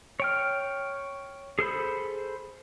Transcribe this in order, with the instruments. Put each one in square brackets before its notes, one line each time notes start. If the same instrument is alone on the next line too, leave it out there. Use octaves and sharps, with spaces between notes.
[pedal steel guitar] C#5 G5 F6
G#4 A4 C5 B5